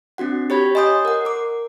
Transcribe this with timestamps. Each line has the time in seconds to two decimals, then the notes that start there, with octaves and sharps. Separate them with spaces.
0.18 C4 D4 F#4 F#5
0.50 G4 C#5 B5 G#6
0.75 D#5 G#5 C6 D#6 G6
1.05 A#4 F#5
1.25 A#4 D6